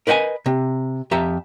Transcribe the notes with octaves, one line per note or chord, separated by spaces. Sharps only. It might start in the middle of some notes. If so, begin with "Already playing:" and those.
A#4 B4 D#5 F#5 G#5
C3
F2 G4 E5 A#5